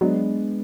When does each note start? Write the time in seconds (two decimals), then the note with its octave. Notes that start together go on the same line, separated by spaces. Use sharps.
0.01 F#3 G#3 B3 D4